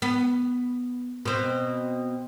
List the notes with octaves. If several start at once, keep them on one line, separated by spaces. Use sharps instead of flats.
B3
B2 C4